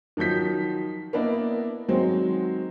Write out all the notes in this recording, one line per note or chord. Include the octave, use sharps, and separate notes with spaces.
D#3 F3 F#3 G6 B6
A#3 B3 D4 E4 D#5
D#3 F#3 G#3 C4 C5